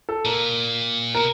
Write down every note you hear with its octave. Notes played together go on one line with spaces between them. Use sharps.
A4
A#2 A#4
B2 A#4